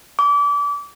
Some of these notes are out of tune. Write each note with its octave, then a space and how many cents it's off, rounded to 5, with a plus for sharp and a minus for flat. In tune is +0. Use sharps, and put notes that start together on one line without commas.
D6 -30